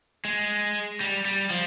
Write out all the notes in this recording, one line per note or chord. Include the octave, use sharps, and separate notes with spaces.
G#3
G3
G3
F3